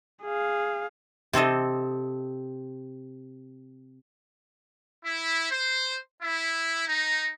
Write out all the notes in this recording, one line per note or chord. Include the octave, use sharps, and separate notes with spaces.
G#4 F5
C3 C4 A4 D#5
E4
C5
E4
D#4